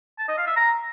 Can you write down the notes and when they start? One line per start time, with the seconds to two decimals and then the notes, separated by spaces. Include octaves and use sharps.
0.19 A5
0.28 D#5
0.37 F5
0.47 E5
0.56 A#5